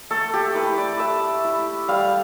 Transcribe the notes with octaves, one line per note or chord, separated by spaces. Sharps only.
A3 A4
G4
E4 B4
D5
A3 E5
E4
G3 F5